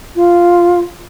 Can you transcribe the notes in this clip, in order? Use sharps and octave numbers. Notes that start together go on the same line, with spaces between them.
F4